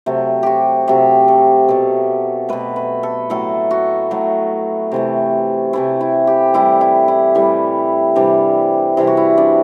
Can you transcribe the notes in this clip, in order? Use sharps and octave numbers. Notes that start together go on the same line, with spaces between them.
C3 F#3 A3
F#4 G4
C3 F#3 A3 G4
A4
B2 A3
B2 A3 B4
B4
A4
A2 F#3 A3 A4
F#4
A2 F#3 A3
C3 E3 A3
C3 E3 A3 E4
E4
G4
A2 E3 G3 E4
E4
E4
A2 E3 G3
C3 E3 G3 D4
C3 E3 G3 E4
F#4
E4
D4